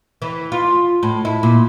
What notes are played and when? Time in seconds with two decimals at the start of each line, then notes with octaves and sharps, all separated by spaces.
0.22 E3
0.52 F4
1.03 A2
1.25 E4
1.43 A#2